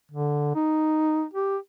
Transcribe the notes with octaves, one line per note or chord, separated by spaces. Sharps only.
D3
D#4
G4